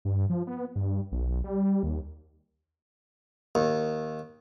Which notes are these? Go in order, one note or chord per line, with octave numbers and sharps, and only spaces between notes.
G2
F3
B3
G2
B1
G3
D#2
D#2